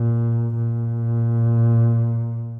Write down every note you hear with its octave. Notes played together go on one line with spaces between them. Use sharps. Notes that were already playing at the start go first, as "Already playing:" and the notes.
Already playing: A#2
A#2